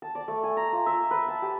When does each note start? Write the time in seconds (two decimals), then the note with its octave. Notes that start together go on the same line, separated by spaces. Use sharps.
0.02 A5
0.15 D5
0.28 A3
0.44 G#5
0.57 A#5
0.73 F4
0.86 E5
1.11 B4
1.28 A5
1.42 G4